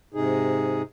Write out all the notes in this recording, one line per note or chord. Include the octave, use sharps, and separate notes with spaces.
G#2 C3 D#4 G#4